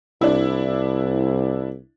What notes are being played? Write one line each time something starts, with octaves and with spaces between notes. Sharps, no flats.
C2 D4 E4